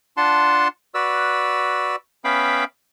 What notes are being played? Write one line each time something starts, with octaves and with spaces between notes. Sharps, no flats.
D4 F4 F#5 A5 C6
F#4 B4 D5 E6
B3 C#4 E5 F5 G5 B5